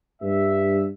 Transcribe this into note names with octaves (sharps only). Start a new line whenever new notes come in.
G2 E5